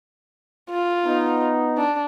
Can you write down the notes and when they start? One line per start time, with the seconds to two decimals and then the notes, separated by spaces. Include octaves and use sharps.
0.70 F4
1.05 B3 D#4
1.77 D4